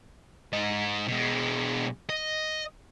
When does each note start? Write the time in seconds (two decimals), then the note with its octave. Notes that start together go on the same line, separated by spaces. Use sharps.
0.53 G#2 D#5
1.07 B2 G#3
2.10 D#5